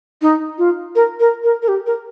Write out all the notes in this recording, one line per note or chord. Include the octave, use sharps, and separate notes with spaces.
D#4
F4
A#4
A#4
A#4
A#4
G4
A#4